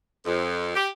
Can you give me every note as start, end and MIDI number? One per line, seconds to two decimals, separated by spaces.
0.25 0.72 41
0.75 0.87 67